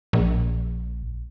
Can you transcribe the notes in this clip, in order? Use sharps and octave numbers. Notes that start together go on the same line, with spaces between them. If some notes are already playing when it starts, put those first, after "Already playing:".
A#1